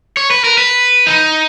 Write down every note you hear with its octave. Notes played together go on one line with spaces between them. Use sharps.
C#5
B4
A#4
B4
D#4